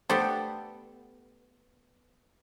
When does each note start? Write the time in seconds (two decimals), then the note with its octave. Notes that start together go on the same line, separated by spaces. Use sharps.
0.10 A3 B3 D4 G4 A4 C5